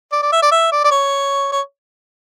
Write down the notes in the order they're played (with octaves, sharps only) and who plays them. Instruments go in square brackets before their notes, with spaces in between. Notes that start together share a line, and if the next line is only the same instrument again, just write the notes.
[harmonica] D5
D5
E5
D5
E5
D5
D5
C#5
C#5